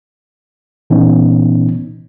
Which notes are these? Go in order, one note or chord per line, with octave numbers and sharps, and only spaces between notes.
A#2 E3 B3 C#4 D#4